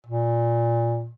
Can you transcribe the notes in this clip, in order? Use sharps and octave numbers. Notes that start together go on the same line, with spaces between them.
A#2